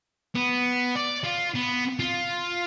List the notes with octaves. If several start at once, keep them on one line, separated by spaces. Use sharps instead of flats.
B3
D5
F4
B3
F4